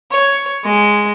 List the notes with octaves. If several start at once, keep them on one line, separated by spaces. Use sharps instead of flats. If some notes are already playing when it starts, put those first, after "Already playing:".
C#5
G#3